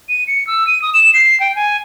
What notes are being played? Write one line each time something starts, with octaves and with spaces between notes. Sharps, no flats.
D#7
C#7
E6
D#7
D#6
E7
C7
G5
G#5